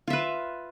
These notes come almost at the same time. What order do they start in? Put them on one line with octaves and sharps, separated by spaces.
F4 E5 B4